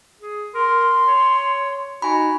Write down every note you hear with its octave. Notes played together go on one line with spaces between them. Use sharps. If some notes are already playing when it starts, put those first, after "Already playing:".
G#4
A#4 C6
C#5
D#4 F#4 G#5 B5